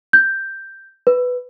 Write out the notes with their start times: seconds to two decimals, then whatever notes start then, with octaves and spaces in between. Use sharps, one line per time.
0.13 G6
1.07 B4